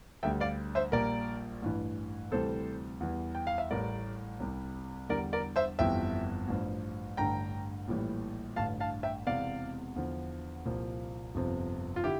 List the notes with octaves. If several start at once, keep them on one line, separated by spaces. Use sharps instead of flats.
D2 D3 G3 E5 G5
D5 F5
C5 E5
A#1 A#2 G3 A#4 D5
A1 G2 E3
D2 C3 E3 G3 A4 C5
E2 E3 G3
G5
F5
E5
A1 A2 G3 A#4 D5
C2 C3 G3
E2 D3 G3 A#4 D5
A#4 D5
C5 E5
G1 F2 E3 G3 E5 G5
A1 G2 F3
A1 G2 D3 G5 A#5
A#1 A2 E3 G3
A1 G2 D3 F5 A5
F5 A5
E5 G5
E1 E2 C3 D5 F5
E2 D3 F3
C2 A#2 F3
G1 F2 C3 F3
F4
D3 E4 G4